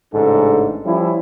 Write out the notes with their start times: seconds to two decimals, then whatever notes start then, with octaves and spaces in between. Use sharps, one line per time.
0.13 A1 G#2 C#3 D4 A4
0.85 F3 G3 C#4 E4